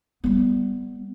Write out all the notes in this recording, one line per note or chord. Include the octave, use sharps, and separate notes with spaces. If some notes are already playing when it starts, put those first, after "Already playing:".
G3 B3